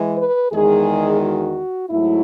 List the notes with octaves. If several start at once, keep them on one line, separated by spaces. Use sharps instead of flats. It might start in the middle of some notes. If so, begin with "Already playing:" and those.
Already playing: E3 G#3
B4
E2 D#3 G#3 G#4
F#4
G#2 F#3 A3 E4